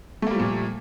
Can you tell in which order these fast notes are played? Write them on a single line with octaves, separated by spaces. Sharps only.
A3 A#3 G3 F3 A#2